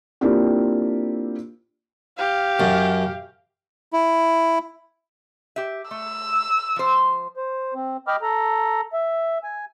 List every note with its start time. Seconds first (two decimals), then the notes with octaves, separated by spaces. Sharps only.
0.21 A#3 C4 D4 E4 F4 G4
2.17 G4 F5
2.60 F#2
3.93 E4
5.56 G4 E5
5.91 A3 E6
6.76 F3 C5
7.37 C5
7.74 C4
8.07 D#5 G5 B5 D6 F6
8.22 A4 A#5
8.93 E5
9.43 G#5